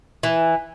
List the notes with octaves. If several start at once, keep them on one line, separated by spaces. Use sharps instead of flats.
E3